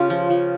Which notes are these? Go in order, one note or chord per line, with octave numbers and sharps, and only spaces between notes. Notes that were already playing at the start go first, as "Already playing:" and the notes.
Already playing: C#3 C#4 F4 G4
F3
F3